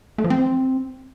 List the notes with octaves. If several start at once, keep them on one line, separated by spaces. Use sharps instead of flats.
A3
F3
C4